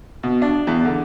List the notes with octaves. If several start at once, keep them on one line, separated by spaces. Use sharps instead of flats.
B2
D4
E2
D3